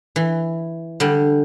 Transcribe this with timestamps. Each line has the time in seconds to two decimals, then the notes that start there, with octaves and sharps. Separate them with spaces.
0.16 E3
1.00 D3 G3